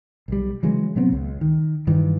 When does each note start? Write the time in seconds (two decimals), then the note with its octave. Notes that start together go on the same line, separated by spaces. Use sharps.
0.28 B1 G3
0.63 C#3 E3 F#3 G#3
0.96 B2 F#3 B3 C4
1.12 C#2
1.41 D#3
1.87 G2 D#3 E3